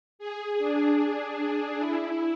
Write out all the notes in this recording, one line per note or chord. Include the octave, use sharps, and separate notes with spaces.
G#4
D4
D4
D4
E4